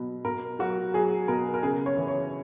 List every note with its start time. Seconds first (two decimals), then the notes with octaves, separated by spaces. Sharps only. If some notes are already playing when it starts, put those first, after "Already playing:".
Already playing: B2 F#3
0.24 B2 A#4
0.59 F#3 F#4
0.94 F#3 G#4
1.28 B2 A#4
1.54 A#4
1.63 C#3 G#4
1.86 C#5
1.97 E3
2.08 C#5